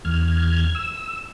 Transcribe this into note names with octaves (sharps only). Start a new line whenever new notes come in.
E2 F6 G#6
E6